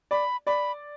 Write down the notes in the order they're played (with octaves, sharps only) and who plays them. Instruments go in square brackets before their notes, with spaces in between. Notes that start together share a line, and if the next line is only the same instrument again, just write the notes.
[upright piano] D5 [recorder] B5
[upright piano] D5 [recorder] B5